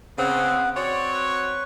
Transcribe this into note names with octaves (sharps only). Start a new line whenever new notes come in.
C#3 B3 C4 B4 F#5
C4 F#4 C#5 D5
B4 C#6